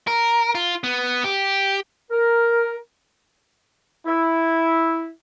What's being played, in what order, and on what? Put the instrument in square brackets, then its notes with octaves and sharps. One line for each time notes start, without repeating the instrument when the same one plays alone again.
[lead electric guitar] A#4
F4
B3
G4
[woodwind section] A#4
[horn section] E4